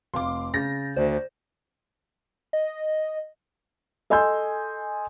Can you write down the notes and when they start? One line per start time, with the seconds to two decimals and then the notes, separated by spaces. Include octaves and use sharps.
0.14 F1 F5 C6 D6
0.54 C#3 G6 A6 A#6
0.96 D2 C5 D5
2.53 D#5
4.10 A4 D#5 G#5 C6 E6 G6